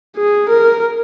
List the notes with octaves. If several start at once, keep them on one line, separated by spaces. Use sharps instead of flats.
G#4
A#4